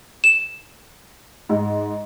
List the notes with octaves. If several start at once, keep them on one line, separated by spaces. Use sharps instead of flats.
E7
G#2